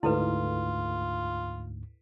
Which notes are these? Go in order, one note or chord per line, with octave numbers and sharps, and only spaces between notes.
D2 G#2 E4 F4 A4 B4